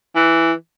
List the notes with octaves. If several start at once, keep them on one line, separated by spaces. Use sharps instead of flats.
E3